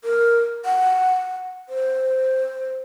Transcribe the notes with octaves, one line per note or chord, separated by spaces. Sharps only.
A#4
F#5
C5